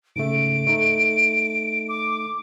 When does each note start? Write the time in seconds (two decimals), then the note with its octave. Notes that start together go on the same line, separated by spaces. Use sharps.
0.16 G#2 C#3 A3 D7
0.67 A3 D#4 A4
1.89 D6